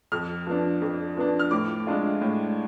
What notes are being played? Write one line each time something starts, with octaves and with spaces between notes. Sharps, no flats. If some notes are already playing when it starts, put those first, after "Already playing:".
F2 F6
F3 B3 D4
F2
F3 B3 D4
F6
A2 D6
G#3 D4 F4
A2